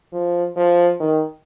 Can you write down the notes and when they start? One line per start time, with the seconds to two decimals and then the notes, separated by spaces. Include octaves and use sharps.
0.13 F3
0.56 F3
1.00 D#3